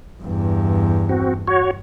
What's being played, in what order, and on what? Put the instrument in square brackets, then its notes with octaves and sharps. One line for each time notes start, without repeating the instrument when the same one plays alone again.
[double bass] E2 G2
[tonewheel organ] C4 F#4
F#4 C#5